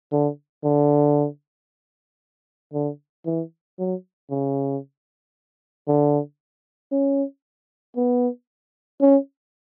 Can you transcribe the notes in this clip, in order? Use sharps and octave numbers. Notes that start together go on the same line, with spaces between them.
D3
D3
D3
E3
F#3
C#3
D3
C#4
B3
C#4